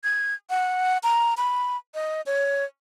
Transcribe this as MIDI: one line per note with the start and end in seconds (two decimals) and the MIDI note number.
0.04 0.34 92
0.50 0.98 78
1.03 1.34 82
1.37 1.77 83
1.94 2.21 75
2.26 2.65 73